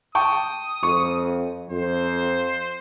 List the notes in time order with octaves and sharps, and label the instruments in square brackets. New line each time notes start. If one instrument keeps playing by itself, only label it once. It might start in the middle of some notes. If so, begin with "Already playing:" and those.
[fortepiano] G5 A5 C#6 [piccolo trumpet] D#6
[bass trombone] F2 [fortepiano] C#6
[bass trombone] F2 [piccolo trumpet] C5